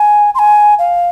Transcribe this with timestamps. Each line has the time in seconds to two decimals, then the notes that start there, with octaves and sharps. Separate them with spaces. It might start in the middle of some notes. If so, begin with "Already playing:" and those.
Already playing: G#5
0.35 C6
0.39 G#5
0.79 F5